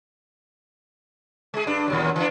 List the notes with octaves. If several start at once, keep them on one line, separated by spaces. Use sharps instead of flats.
G#3 G#4
G2 D4
D#2 A#2 F#3
E3 D4